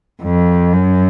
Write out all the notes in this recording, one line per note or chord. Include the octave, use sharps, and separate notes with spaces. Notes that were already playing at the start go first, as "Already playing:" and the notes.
F2
F#2